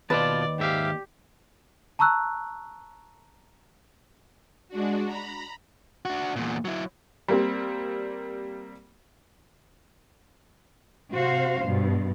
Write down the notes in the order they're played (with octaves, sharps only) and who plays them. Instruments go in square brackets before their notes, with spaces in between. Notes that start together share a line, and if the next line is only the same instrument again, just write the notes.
[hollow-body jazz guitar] D#2 B4 [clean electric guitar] B2 F4 A5 [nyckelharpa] D5
[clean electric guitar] G#2 E5 F5 [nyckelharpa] G4
[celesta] A5 A#5 C#6 E6 F#6
[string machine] G#3 D4 F#4
A#5 B5
[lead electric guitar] D4 F#4
E2 A#2
F#3 E4
[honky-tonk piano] G3 A#3 C4
[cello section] C3 F#4 C5 F5
G2 B2